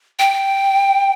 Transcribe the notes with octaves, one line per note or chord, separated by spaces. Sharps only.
G5